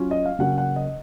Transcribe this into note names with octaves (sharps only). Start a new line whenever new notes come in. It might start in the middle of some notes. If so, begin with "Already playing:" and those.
Already playing: F#3 C#4 F4
D#5
F5
C#3 F#3 A#3 C#4 F#5
F#5
D#5